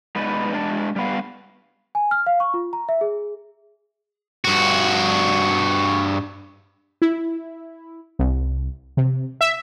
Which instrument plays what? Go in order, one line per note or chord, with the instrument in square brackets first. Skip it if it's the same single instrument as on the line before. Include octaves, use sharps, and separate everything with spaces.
[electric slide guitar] G#3 B3 D#4 B4 D5
G#3 D4 D5
G3 B3 F5
[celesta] G#5
F6
F5
C#6
F4
A#5
E5
G#4
[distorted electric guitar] G2 F#4
[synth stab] E4
C2
C3
E5